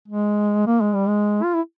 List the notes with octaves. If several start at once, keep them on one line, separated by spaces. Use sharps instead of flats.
G#3
A#3
G#3
G3
G#3
F4
E4